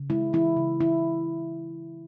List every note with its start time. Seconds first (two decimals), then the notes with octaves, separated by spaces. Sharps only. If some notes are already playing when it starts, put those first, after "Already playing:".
Already playing: C#3
0.10 G#3 E4
0.33 E3 E4
0.57 C#3
0.81 E3 E4